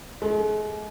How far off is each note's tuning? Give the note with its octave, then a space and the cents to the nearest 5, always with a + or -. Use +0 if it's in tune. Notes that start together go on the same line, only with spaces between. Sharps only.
G#3 +40